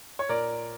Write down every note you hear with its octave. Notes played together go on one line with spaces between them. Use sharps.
C#5
A#2 A#4 D5